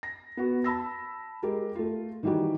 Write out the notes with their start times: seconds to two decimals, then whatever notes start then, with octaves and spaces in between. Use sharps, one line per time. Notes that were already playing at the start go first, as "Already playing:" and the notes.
0.03 A#6
0.37 B3 F#4
0.64 A5 B5 E6 A#6
1.43 G#3 G4 A#4
1.75 A3 F4
2.23 D#3 E3 G3 D#4 F#4 G4